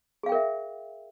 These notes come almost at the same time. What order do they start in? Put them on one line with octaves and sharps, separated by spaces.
G#4 F5 G5 A#4 E5